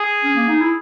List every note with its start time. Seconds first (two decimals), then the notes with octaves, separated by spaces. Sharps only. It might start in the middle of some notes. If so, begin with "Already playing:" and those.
Already playing: G#4
0.24 C#4
0.36 A#3
0.48 D#4
0.61 E4